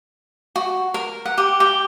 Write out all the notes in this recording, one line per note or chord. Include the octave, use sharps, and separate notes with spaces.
F#4
A#4
F#5
G4
G4